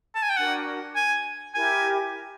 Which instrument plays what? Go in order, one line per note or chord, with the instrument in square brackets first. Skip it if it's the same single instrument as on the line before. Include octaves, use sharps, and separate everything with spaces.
[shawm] A5
G#5
G5
[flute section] D4 F#4 A#4 [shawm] F#5
[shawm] G#5
[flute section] E4 G4 A#4 [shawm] G#5